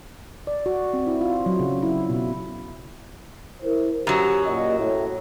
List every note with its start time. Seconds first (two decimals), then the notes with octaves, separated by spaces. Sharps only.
0.47 D5
0.66 F#4
0.94 C4
1.07 E4
1.21 F4
1.46 F#3
1.60 C#3
1.82 E4
2.09 B2
3.63 E4 A#4 C5
4.07 F#2 F#3 G4
4.47 A#2 D#5
4.77 A2